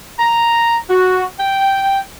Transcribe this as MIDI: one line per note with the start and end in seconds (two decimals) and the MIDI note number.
0.20 0.77 82
0.89 1.25 66
1.40 2.00 79